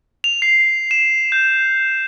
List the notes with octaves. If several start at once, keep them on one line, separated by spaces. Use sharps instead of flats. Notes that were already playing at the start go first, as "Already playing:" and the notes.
F7
C7
E7
G6